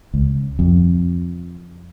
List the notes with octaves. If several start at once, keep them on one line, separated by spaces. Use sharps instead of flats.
C#2
F2